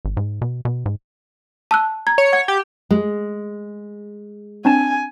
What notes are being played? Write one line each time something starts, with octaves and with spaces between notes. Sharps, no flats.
G#1
G#2
B2
B2
G#2
A5 E6 F#6
A#5 G#6
C#5
F#5 G#6
G4
G#3
C4 D4 G#5 A5